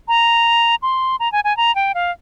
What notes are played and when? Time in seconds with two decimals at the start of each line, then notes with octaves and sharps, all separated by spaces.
0.08 A#5
0.82 C6
1.20 A#5
1.32 G#5
1.44 G#5
1.57 A#5
1.75 G5
1.95 F5